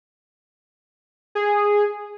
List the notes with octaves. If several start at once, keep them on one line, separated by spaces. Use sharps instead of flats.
G#4